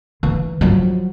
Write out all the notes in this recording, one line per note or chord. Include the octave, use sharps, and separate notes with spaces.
E3
F3 F#3